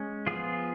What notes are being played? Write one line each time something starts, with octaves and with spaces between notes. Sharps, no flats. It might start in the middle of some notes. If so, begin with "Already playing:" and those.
Already playing: G#3 C#4
F3 B3 F4 G#4